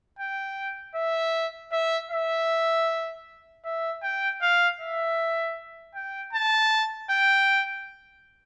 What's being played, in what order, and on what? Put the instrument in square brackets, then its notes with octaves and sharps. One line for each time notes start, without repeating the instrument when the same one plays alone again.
[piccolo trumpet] G5
E5
E5
E5
E5
G5
F5
E5
G5
A5
G5